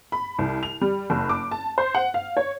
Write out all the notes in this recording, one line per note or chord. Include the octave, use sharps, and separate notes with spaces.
B5
C2
F7
G3
F#1
D6
A5
C5
F#5
F5
C#5